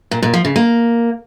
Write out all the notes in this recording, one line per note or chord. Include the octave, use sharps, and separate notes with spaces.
A#2
A#2
F3
C#3
A#3